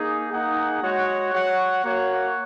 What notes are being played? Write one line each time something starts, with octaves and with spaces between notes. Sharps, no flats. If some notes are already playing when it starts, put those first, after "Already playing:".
Already playing: A#3 D#4 G#4
A#3 D#4 G#4 F#5
G#3 F#4 C#5 F#5
F#4 C#5 F#5
A#3 F#4 C#5 F#5